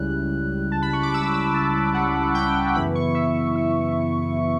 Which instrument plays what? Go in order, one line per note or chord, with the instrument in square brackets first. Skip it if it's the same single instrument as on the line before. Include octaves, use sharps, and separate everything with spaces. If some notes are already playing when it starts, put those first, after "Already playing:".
Already playing: [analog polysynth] C#2 C#3 G3 C#4 E4 F#6
A5
B5
C#6
D6
E6
E6
A5
F#5
F#5
G5
F#2 C#3 E3 B3 E4 B5
C#6
E5
E5